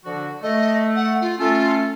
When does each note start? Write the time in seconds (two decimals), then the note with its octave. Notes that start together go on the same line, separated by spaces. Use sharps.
0.05 D3 F3 F#4
0.43 A3 D#5
0.96 F#5
1.21 F4
1.39 A3 C#4 F4 A4